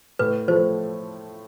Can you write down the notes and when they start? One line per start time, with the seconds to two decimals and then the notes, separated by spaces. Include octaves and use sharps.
0.19 A2 B4
0.48 F3 A3 C5